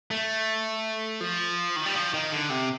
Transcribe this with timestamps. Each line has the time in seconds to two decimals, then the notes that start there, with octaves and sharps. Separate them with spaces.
0.11 A3
1.21 F3
1.76 D#3
1.86 G3
1.94 F3
2.14 D#3
2.32 D3
2.50 C3